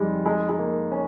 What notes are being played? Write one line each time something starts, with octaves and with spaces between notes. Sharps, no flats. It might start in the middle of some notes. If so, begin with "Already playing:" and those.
Already playing: F2 D#3 G3 G#3
G#3
G#3
A#3
C#4